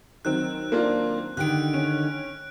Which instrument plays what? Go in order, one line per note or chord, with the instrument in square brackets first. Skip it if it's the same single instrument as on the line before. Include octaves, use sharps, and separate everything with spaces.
[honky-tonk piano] D#3 F#3 C4 [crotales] F#6
[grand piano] A#3 D4 F4
[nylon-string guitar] D3 D#3 [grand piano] G4 [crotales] F#6 D7
[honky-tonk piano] C#4